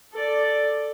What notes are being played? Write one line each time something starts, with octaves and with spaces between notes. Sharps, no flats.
A4 D5